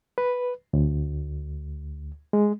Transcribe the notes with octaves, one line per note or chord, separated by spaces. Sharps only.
B4
D2
G#3